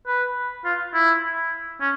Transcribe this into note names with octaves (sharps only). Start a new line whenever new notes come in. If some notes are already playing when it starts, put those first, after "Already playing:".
B4
F4
E4
C#4